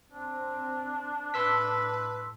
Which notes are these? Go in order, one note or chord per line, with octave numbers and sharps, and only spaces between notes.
C4 D4
A2 B4 C6 E6 B6